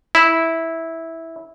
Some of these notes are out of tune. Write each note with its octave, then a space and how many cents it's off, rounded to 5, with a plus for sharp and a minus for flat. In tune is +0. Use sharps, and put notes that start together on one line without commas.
E4 -10